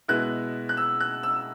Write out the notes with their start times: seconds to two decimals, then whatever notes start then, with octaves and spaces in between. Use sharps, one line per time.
0.08 B2 G#3 B3 E4 F#6
0.69 F#6
0.77 E6
1.00 F#6
1.23 E6
1.36 E6